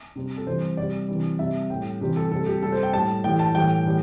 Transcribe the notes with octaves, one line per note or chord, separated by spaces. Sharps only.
C3 G3
A4
C3 E3 G3 C5
C3 G3 D5
C3 E3 G3
C3 G3 E5
A2 G3 G5
C3 E3 G3 G4
A4
C3 G3 A4
G4
C3 G3 A4
C5
G5
A2 G3 A5
A2 E3 G3 G5
A5
A2 E3 G3 G5
A2 E3 G3